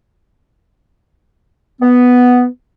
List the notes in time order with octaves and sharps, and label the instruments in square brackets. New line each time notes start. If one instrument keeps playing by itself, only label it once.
[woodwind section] B3